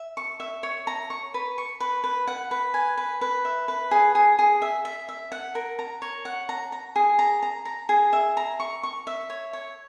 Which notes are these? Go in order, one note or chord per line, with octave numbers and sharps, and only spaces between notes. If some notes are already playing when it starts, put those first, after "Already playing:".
Already playing: E5
C#6
E5
C#5
A#5
C#6
B4
C#6
B4
B4
F#5
B4
G#5
B4
B4
E5
B4
G#4
G#4
G#4
E5
E5
E5
F#5
A#4
A#5
C#5
F#5
A#5
A#5
G#4
A#5
A#5
A#5
G#4
E5
A#5
C#6
C#6
E5
C#5
C#5